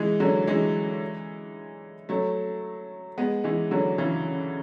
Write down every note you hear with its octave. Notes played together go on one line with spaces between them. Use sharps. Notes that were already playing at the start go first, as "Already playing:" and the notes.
Already playing: E3 G#3
D3 F#3
E3 G#3
F#3 A3
G#3 B3
E3 G#3
D3 F#3
C#3 E3